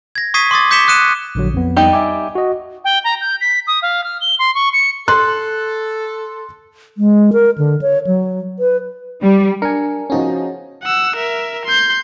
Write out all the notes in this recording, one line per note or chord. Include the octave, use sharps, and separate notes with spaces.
G#6 A#6
C#6 D#6 G#6 B6 C7 D#7
C6 D6 D#6 A6
D6 G6 B6 C#7 E7 G7
D#6 F#6 C#7 D#7 E7
A#1 D3 F#3
F2 B3
G3 D#4 G4
E5 G#5 D6
F#4 D#5
G5
A#5
G6
B6
D#6
F5
F6
G7
C6
C#6
C#7
A4 C6 F#6
G#3
A#4
D3
C#5
F#3
B4
G3
D4 A#4 G#5 C#7
F3 C#4 D#4 F#4 G#4
F#5 E6
A#4 E5
C6 G6